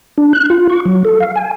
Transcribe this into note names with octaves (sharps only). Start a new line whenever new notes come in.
D4
F#6
F4
C#6
F#3
A4
F5
G#5